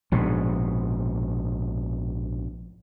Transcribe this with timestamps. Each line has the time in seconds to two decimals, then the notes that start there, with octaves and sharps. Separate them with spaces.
0.12 A#1 G#2 B2